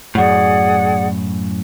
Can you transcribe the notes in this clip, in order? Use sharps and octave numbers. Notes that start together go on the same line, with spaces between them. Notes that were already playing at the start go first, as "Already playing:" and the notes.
F#2 A2 G#4 D5 F#5